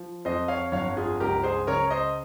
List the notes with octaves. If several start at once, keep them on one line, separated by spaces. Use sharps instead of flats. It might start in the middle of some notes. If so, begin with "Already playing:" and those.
Already playing: F3
F2 C5 D#5
C#5 F5
G1 C#5 F5
F4 G#4
C#2 G4 A#4
G#4 C5
C#3 A#4 C#5
C5 D#5